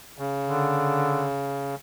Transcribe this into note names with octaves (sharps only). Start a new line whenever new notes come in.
C#3
D3